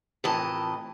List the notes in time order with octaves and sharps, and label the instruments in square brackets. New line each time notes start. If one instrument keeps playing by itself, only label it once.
[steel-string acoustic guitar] F2 A2 E3 A#4 D#5 A5